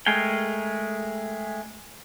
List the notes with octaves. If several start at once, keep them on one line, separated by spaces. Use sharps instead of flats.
G#3 A3 G#4 A#4 G5